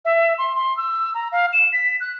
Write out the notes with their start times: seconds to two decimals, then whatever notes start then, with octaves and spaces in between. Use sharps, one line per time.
0.05 E5
0.38 C6
0.56 C6
0.77 E6
1.14 A#5
1.32 F5
1.53 E7
1.73 B6
2.00 F#6